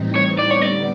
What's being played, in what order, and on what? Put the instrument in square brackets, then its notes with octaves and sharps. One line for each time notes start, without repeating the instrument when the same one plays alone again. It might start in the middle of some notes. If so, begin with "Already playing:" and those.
Already playing: [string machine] A2 E3 G3 C4 D#4
[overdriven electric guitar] C#5
[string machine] D3 G3 B3 [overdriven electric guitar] D5
[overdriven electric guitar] C#5
D5